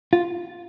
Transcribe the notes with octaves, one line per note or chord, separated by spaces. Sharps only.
F4